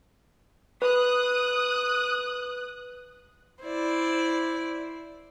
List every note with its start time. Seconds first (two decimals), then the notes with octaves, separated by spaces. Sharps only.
0.82 B4 D#6 F#6
3.63 E4 C5 D5